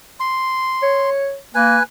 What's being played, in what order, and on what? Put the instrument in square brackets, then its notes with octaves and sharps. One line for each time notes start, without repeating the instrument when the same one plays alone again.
[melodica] C6
[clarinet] C#5
[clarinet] A#3 [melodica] B4 G#5